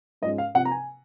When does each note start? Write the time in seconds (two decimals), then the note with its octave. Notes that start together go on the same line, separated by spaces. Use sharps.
0.22 G#2 F3 G#3 C#4 D#5
0.38 F5
0.54 C3 F3 C4 F#5
0.65 A#5
0.71 G#5